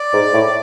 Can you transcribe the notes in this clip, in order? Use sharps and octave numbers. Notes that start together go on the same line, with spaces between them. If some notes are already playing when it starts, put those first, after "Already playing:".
Already playing: D5
G#2
A2